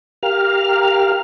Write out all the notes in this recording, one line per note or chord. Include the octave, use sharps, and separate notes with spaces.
G4 A#4 F5 F6